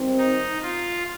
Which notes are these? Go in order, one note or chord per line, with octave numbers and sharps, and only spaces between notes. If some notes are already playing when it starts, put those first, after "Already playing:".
Already playing: D#3 G3 C4
D#4
F4